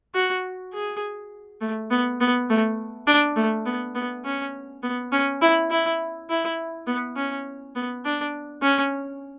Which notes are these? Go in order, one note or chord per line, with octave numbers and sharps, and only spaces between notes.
F#4
G#4
A3
B3
B3
A3
D4
A3
B3
B3
C#4
B3
C#4
E4
E4
E4
B3
C#4
B3
D4
C#4